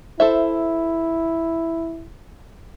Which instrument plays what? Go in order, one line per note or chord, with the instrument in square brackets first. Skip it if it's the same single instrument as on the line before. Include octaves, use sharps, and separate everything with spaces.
[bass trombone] E4 [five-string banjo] A4 C5 E5